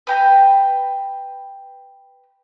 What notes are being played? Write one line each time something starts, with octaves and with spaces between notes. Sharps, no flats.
B4 G5 A#5